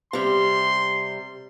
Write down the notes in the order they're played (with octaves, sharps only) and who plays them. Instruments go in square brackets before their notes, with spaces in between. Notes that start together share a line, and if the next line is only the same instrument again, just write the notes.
[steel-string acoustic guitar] C3 G3 [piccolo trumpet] C6